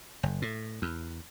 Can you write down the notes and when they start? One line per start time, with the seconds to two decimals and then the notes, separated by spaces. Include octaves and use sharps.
0.23 F#1
0.42 A2
0.82 E2